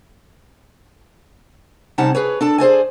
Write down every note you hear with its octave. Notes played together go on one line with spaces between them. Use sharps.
C3 G3 C#4 D#4 F#5 A5
G#4 B4 C#5
D4 A4 A5
G#4 C5 D5 G#5